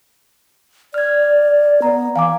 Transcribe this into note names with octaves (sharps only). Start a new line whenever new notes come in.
D5 F6 G#6
B3 A#5
E3 F5 G#5 D6